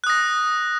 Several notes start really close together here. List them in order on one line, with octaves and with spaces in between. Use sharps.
F#6 D#6 A#6